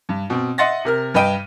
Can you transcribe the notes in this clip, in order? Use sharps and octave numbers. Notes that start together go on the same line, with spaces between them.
G2
B2 C4
D#5 E5 F#5 C6 A6 A#6
C3 A#4 F6
G2 B4 D#5 G5 D#7